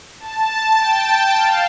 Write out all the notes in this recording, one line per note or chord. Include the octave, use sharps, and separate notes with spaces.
A5
G5
G5
F5